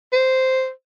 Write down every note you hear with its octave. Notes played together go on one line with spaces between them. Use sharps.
C5